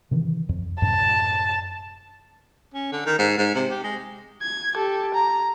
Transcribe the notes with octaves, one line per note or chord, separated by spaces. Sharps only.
C3 D#3 E3
F2
F#2 A2 C3 A5
C#4
D3
D#3
G#2
G#2
C3
G4
G#3
G#6
G4 A4
A#5